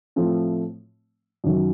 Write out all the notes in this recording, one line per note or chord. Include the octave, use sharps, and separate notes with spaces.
A2 F3 A3 C4
F#2 D#3 F#3